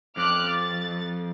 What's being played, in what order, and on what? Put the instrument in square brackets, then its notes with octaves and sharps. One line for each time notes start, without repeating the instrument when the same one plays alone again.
[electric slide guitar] F2 [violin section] D6 F6 F#6
[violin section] A6